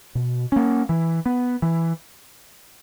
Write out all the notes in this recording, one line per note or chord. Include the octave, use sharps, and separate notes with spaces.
B2
A#3 C#4
E3
B3
E3